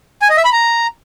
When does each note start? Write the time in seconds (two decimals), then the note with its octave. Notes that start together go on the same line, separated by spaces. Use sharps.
0.22 G#5
0.29 D#5
0.37 E5
0.45 B5
0.52 A#5